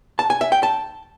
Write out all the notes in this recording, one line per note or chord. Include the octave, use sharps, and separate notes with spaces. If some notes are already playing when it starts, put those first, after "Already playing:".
A5
G#5
E5
G5
A5